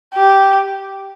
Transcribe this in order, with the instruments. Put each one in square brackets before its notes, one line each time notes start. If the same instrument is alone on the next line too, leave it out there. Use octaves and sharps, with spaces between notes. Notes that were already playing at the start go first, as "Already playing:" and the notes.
[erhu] G4